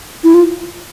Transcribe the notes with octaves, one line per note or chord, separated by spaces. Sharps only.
E4
F4